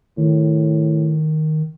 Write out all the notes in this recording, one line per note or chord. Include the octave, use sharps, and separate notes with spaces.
A2 D#3